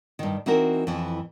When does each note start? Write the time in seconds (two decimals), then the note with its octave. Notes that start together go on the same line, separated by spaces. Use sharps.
0.19 G2 D#3
0.46 E3 C4 D#4 F#4 A#4
0.87 F2 E3